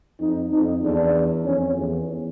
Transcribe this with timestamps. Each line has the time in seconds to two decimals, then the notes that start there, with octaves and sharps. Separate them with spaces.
0.20 F2 D#4
0.52 F2 D#4
0.83 E2 D4
1.46 F2 C#4
1.77 E2